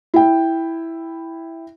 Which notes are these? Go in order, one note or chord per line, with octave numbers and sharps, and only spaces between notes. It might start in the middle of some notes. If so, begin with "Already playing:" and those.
E4 G5